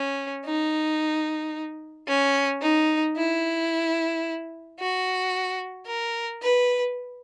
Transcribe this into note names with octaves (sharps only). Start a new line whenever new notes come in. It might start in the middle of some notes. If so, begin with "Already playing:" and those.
Already playing: C#4
D#4
C#4
D#4
E4
F#4
A#4
B4